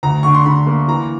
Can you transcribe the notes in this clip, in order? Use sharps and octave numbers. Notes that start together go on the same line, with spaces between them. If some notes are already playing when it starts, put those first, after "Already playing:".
D2 A#5
D3 C#6
C6
D3 B5
A#3
E3 A#5